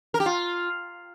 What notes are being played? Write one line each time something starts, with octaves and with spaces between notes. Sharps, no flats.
A#4
G4
F4